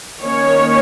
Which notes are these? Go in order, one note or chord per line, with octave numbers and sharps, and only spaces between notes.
D#3 A#3 C#4 C#5